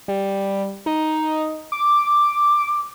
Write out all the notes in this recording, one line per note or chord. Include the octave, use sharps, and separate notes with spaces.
G3
D#4
D6